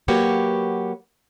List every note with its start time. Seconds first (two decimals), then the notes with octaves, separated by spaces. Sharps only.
0.08 F#3 A#3 F#4 G4 B4 C#5